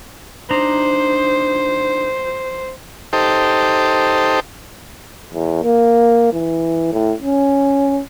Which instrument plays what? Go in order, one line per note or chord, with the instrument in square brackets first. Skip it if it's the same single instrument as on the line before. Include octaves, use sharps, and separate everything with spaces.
[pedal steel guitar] D4 D#4 A#5 [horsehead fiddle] C5
[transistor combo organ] D#4 G4 A4 C5
[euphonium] E2
A#3
E3
A2
C#4